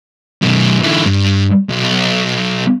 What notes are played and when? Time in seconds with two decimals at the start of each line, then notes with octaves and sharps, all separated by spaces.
0.42 F#2 B2
0.83 D3 E3
1.06 G2
1.69 B1